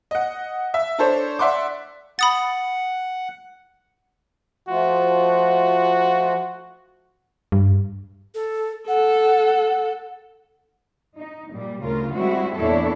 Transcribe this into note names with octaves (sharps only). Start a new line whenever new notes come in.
D#5 F#5
E5
D4 A4 C5 C#5
D5 E5 F#5 C6 D6
F#5 B5 D#6 A6
F3 A3 F4 F#4
G2
A4
A4 F#5
D#4
A#2 G3
D2 C#3 F4 A#4
G3 G#3 C4 E4 F#4
E2 A#2 D4 E4 A4 C#5